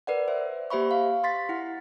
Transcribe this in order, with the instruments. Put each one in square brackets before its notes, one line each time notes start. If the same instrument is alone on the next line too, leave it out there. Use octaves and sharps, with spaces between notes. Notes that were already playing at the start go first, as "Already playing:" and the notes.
[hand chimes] A#4 B4 D5 F#5
C5 E5
A#3 G4 C5 E5 B5 C#6
F5
C6 A6 B6
E4 F#5